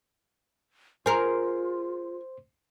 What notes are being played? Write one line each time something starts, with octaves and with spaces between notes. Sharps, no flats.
F4 G#4 A#4 C5 C6